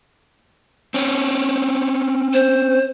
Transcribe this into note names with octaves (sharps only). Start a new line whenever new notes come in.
C4 C#4
C5